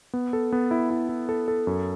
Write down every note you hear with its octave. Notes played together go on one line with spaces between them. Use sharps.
B3
A4
B3
E4
E4
E4
A4
A4
F#2